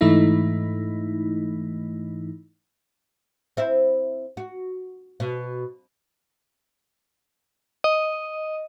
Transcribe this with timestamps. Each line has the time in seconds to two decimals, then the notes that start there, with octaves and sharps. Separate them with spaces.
0.01 G#2 E3 A3 D#4 E4
3.57 C4 E4
4.37 F#4
5.20 B2
7.84 D#5